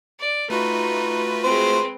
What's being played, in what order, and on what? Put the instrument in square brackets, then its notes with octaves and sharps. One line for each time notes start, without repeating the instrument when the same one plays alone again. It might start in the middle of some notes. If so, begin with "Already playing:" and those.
[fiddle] D5
[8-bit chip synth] A3 F4 F#4 [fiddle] D#4 [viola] B4
[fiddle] G#3 C4 [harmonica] C5